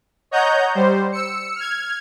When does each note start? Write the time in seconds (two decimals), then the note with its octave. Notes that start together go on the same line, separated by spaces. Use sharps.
0.31 C#5 D#5 F#5 A#5 G6
0.75 G3 C5
1.12 E6 C#7
1.56 F6 G#6